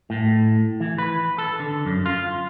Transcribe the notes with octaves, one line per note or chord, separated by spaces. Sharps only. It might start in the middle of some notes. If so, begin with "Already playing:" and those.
A2
E3
B4
A4
D3
F#2
F4